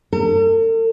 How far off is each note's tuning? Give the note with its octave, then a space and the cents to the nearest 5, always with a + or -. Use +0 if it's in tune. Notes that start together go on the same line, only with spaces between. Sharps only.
A4 +45